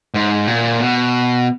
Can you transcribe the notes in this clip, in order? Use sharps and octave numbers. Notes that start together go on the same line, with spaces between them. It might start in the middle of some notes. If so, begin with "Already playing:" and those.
G#2
A#2
B2